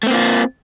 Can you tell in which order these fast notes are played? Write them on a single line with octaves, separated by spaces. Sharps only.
A3 C4 A#3 F4